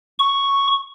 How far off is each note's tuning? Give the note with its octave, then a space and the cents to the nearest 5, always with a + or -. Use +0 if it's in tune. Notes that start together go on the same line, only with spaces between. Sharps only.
C#6 +0